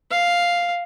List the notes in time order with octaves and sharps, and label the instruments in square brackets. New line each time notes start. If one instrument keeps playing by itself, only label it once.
[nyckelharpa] F5